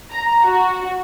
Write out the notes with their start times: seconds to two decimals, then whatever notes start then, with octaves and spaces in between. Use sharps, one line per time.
0.10 A#5
0.43 F#4